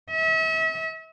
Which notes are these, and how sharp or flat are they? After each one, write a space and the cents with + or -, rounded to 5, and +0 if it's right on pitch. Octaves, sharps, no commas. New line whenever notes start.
E5 -40